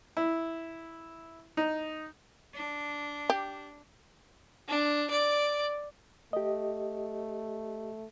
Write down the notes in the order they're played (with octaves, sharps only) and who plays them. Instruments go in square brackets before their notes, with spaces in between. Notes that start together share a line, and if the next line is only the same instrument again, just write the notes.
[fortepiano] E4
D#4
[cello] D4
[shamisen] G4
[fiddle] D4
D5
[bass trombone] A3 [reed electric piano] G4 D#5